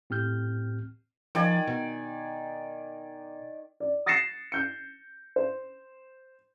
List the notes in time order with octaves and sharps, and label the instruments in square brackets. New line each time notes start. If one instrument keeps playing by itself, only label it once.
[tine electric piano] A2 C4 G4 F6 G6
[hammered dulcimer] D#3 D5 G#5 [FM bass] F3
[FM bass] B2
[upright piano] D5
D#6 A6 A#6 C7 C#7 E7
G6 C#7
C5